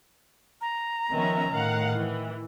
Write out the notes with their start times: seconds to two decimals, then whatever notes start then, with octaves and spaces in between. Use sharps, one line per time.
0.61 A#5
1.11 D#3 F3 B3 C#4 E5
1.51 A2 D#3 F5 F#5
1.94 E3